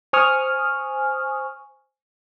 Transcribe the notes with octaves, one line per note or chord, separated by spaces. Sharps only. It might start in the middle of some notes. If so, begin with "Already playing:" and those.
C5 G#5 C#6 D#6 F6